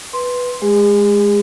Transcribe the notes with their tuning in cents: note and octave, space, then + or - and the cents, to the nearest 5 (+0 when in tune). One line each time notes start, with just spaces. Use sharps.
B4 +0 C6 +0
G#3 +0 G#4 -40